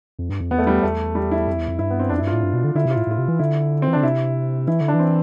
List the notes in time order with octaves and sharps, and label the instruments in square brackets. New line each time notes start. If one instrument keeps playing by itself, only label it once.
[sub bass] F2
G2
F2
[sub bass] E2 [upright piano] B3
[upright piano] A3
G3
[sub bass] E2 [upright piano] A3
[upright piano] G3
E4
[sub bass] F2
E2
F2
[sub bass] G2 [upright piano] E4
[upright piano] B3
C4
[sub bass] F2 [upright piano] D4
[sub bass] G2 [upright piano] E4
[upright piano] F4
[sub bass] A2
G2
B2
D3
[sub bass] D3 [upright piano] E4
[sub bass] C3
[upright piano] F4
[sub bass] A2
[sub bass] A2 [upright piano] F4
[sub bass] C3
E3
[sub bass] D3 [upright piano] E4
[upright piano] C4
[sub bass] E3
[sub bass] D3 [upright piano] D4
[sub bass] C3 [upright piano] E4
[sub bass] E3 [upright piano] E4
[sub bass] D3
[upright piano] D4
[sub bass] E3
[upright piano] C4